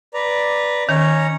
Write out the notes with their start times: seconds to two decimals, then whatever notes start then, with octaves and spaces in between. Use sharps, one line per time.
0.14 B4 D5 A#5
0.89 D#3 C#4 C#5 A#5